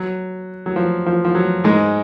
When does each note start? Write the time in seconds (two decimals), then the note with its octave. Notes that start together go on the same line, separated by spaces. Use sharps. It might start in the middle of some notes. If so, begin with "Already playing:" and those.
Already playing: F#3
0.66 F#3
0.76 F3
1.06 F3
1.25 F3
1.35 F#3
1.64 G#2 G#3